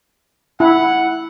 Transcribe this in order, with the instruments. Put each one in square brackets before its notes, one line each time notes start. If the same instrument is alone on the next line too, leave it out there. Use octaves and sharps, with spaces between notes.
[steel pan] E4 [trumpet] F#5